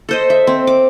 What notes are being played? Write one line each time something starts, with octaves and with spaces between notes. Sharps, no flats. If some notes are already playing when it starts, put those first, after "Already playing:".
A4 C5 D#5
E5
C4
D6